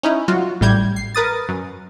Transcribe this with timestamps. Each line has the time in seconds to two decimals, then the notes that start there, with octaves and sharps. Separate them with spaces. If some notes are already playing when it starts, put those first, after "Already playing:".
0.03 C#4 D#4 E4
0.28 F#3 F4 F#4
0.61 A1 A2 G3 G6 G#6
0.96 C7
1.14 A#4 B4 D#6 A6
1.49 F#2